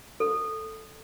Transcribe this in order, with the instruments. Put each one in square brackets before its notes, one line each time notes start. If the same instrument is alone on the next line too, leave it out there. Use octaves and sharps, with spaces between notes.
[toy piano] A4